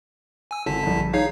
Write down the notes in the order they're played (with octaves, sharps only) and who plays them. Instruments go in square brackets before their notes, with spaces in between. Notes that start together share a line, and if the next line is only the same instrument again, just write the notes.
[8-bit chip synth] G#5 E6
[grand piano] G#1 [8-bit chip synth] D3 A5 B6
[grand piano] A#1 G2
[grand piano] D#3 G#4 C7 [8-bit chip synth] D#4 C#5 F5